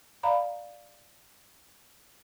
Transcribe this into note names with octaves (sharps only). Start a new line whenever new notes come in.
D5 F5 A#5 B5